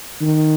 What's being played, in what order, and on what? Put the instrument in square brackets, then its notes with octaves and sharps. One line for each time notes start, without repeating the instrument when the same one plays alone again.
[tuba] D#3